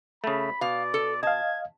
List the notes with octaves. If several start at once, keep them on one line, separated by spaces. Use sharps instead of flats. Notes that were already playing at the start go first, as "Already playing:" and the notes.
C#3 A3 B5
B2 D5 F5
A4
D#5 F5 A5 G#6